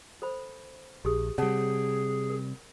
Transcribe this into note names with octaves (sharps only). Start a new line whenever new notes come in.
A4 C5 B5
A#1 G4 G#4 D#6
C3 G3 G#4 C#5 F#5 A5
A#4